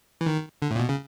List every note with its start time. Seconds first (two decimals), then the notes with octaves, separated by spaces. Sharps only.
0.21 E3
0.26 D#3
0.62 D3
0.71 A2
0.76 A#2
0.80 B2
0.89 C#3